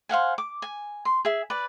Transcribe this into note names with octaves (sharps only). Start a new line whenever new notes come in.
C5 F5 F#5 G#5
D6
G#5
C6
G#4 E5
B4 D5